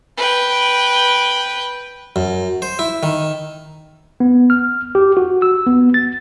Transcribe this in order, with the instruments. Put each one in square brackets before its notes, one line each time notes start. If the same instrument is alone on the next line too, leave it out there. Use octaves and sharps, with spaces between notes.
[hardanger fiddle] B4 G5
[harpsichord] F#2
C5
E4
D#3
[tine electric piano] B3
F6
G4
F#4
E6
B3
A6